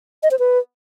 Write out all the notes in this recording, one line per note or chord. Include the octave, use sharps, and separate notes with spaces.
D#5
C5
B4